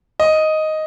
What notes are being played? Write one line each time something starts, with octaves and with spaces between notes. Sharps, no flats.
D#5